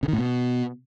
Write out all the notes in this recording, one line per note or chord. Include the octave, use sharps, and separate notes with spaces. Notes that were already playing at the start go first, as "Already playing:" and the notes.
C#3
D#3
A2
B2